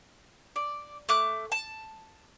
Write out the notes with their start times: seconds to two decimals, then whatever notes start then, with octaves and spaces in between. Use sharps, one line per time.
0.56 D5
1.09 A3 D6 F#6
1.52 A5